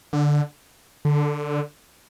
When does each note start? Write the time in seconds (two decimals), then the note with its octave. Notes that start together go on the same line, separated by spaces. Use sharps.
0.13 D3
1.05 D3